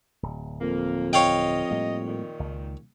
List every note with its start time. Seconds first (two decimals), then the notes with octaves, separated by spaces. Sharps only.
0.23 D1
0.61 F2 A#3
1.13 C#5 D#5 F5 G5
1.71 A2 G3 A#3
2.05 A#2 D#3
2.39 C#2